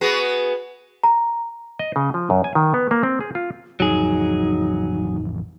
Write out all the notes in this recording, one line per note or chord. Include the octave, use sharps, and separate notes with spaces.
B3 F#4 G#4
A#5
D#5
C#3
F3
F#2
G#5
D#3
B3
A#3
C4
G#4
F4
A1 F2 F#3 D#4 G#4